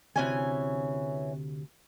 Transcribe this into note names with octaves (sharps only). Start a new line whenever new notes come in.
D2 C3 E3 C#4 G#5